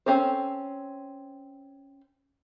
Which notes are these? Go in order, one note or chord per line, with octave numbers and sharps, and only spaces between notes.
C4 C#4 A4 C5